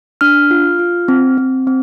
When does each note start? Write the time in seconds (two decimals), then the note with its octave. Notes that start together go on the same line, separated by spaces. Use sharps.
0.21 D4 F6
0.51 F4
0.79 F4
1.08 C4
1.38 C4
1.67 C4